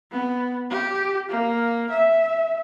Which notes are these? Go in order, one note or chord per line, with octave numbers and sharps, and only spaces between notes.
B3
G4
A#3
E5